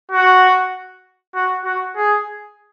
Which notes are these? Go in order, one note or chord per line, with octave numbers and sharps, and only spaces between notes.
F#4
F#4
F#4
G#4